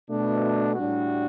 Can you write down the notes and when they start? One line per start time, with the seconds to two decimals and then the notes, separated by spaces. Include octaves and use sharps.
0.10 B2 A3 D4
0.75 A2 G3 D4 F#4